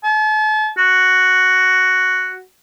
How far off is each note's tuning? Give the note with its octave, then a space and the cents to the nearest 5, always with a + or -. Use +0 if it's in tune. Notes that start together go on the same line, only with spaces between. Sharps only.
A5 -40
F#4 +5